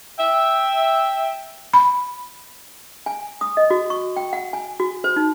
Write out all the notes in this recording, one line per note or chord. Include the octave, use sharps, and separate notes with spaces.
E5 G5
B5
G#5
D#6
D#5
F#4
C#6
G5
F#5
G#5
F#4
C5
D#4